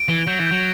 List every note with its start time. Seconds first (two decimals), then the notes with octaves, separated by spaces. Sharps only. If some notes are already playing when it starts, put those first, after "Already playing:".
Already playing: D7
0.09 E3 G7
0.27 F#3 G6
0.40 E3
0.46 G6
0.52 F#3